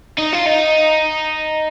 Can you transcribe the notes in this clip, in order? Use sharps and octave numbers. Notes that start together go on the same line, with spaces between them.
D#4
F4
D#4